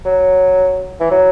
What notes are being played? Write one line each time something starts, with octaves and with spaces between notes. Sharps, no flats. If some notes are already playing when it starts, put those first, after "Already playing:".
F#3
E3
F#3